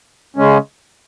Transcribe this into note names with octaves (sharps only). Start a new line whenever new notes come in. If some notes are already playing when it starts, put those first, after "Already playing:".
C#3 G#3 C#4